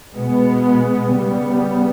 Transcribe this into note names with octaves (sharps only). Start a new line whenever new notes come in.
B2 G#3 B3
C#3 G3 B3